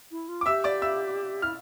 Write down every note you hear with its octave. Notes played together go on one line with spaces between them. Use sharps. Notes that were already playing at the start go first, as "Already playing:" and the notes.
E4
F4
D6
G4 E5 E6
D5 D6
E5 E6
E4 F6